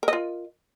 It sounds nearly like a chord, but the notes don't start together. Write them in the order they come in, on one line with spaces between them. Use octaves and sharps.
A#4 D#5 F4